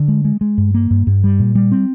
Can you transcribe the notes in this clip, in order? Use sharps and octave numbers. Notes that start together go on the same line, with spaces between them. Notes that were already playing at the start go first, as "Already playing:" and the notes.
Already playing: D3
G#3
G#3
G#3
G2
A#3
G2
G2
G3
A#2
G3
C4